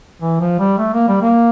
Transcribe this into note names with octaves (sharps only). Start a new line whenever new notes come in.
E3
F3
G3
A3
A#3
G3
A#3